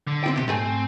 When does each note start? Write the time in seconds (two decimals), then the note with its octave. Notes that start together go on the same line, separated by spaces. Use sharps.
0.07 D3
0.24 C4 E4 G5
0.36 C#2 C3 G4
0.48 G#2 A3 C4 G#5